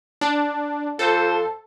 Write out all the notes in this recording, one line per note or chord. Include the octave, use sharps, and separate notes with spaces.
D4
F2 A4 C5